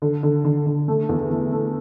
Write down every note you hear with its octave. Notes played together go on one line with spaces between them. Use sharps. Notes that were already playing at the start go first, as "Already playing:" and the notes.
D3
D3
D3
D3
A3
E2
A3
A3